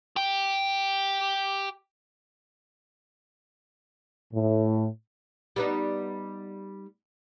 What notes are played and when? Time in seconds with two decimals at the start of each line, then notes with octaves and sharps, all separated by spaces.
0.16 G4 G5
4.33 A2
5.56 G3 B3 D#4